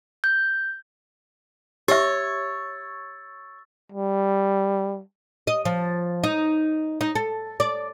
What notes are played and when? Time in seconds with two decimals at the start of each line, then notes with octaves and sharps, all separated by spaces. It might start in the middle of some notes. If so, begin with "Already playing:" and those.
0.24 G6
1.88 G4 C#5 E5 C#6 E6 A6
3.92 G3
5.47 D#5
5.65 F3
6.24 D#4
7.01 D#4
7.15 A4
7.60 D5